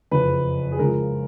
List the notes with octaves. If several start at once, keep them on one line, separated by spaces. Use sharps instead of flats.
F#1 F2 C#3 B4
G#4
C#2 C#3 F3 G#3 A#4